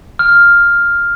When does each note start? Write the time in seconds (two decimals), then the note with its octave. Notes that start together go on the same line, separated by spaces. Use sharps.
0.19 F6